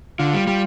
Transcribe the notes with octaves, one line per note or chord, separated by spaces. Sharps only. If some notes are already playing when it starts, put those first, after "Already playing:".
D3 F4
G3
G3